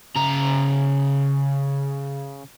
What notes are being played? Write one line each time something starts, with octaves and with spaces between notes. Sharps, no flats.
C#3 A#5